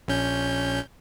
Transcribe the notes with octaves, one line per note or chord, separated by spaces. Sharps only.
A#1 C#4 G6